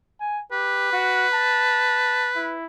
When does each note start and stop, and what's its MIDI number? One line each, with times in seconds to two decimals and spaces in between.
0.21 0.42 80
0.52 0.89 67
0.52 2.54 71
0.93 1.27 66
1.34 2.30 81
2.36 2.66 64